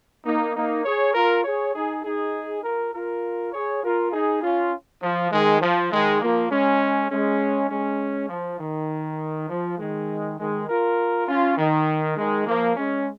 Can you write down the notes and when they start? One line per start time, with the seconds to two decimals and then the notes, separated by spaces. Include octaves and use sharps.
0.25 A#3 D#4
0.54 A#3 D#4
0.85 G#4 C#5
1.14 F4 A#4
1.44 G#4 C#5
1.74 D#4 G#4
2.03 D#4 G#4
2.63 F4 A#4
2.93 F4 A#4
3.53 G#4 C#5
3.83 F4 A#4
4.12 D#4 G#4
4.42 C#4 F4
5.02 F3
5.31 D#3 G#3
5.61 F3
5.91 D#3 G#3
6.20 F3 A#3
6.50 G#3 C#4
7.10 G#3 C#4
7.70 G#3 C#4
8.29 F3
8.59 D#3
9.49 F3
9.78 D#3 G#3
10.38 D#3 G#3
10.68 F4 A#4
11.28 C#4 F4
11.58 D#3
12.17 D#3 G#3
12.47 F3 A#3
12.76 G#3 C#4